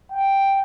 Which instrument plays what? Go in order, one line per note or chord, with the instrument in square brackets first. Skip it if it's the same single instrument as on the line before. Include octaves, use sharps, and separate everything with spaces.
[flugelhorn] G5